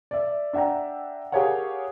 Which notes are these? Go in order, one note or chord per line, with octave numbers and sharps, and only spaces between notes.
D5 E5
D4 E5 F#5 G5 A#5
G4 G#4 A#4 C#5 F5 F#5